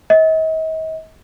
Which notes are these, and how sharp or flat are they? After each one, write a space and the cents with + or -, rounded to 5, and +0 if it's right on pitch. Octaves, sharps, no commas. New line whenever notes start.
D#5 +40